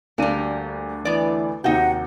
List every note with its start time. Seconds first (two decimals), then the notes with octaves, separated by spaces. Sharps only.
0.18 D2 G3 A#3 D4 D#7
1.05 E3 B3 D5
1.64 D#2 C3 D#4 F#4 E5 F#5 G5